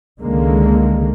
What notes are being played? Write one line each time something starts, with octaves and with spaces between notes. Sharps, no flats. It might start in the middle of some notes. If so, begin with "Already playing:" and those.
C#2 D3 D#3 G#3 A#3